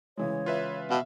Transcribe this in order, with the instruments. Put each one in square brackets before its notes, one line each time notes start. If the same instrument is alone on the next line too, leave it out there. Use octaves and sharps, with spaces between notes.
[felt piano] C#3 E3 G#3 [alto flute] C#5
[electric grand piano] F4 B4 E5
[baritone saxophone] B2 [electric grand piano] E5 F5